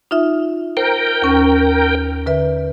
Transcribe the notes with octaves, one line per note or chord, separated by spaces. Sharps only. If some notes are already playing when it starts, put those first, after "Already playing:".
D#4 F4 E5
A#4 C5 G5
D#2 C#4
D3 B4 E5